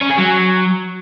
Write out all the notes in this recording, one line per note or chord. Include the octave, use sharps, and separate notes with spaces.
C#4
G#4
F#3